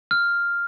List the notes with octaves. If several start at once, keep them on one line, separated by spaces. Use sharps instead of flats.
F6